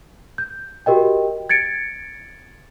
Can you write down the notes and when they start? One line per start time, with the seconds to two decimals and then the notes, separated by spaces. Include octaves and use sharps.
0.38 G6
0.86 F#4 G4 A#4 D#5 G5
1.49 G#6 A6 C#7 D7